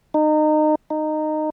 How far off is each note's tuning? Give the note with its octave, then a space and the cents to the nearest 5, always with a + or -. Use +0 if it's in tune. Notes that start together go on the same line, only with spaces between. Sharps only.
D#4 -25
D#4 -15